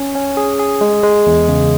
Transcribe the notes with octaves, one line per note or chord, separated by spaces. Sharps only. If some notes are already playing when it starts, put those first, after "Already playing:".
Already playing: C#4
C#4
G#4
G#4
G#3
G#3
E2
C#3